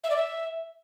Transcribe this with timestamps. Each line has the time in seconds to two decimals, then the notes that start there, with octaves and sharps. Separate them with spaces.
0.04 E5
0.10 D5
0.16 E5